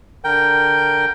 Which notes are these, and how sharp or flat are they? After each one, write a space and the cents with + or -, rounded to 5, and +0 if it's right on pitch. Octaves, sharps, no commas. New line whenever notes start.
D3 +0 A#4 +0 G5 +0